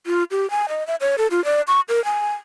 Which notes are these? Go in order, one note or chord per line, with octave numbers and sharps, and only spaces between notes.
F4
G4
G#5
D#5
E5
C#5
A4
F4
D5
C#6
A#4
G#5